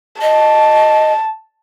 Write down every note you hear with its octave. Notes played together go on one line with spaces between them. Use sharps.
D#5 A5